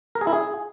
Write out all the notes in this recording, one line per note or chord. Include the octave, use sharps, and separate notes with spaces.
A#4
G#4
E4
G#4